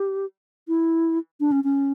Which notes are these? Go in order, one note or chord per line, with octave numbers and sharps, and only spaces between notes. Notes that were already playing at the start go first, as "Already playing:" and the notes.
Already playing: G4
E4
D4
C#4
C#4